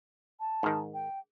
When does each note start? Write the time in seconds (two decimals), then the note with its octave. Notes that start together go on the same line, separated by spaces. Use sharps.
0.40 A5
0.63 G#2 D#3
0.94 G5